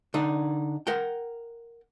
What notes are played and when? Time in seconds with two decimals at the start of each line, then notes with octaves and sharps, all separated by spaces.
0.14 D3 D4 D#4
0.87 A#4 F#5 G5